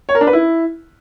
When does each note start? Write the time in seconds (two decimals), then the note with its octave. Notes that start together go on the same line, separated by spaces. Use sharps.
0.09 C#5
0.15 A#4
0.21 D4
0.27 B4
0.33 E4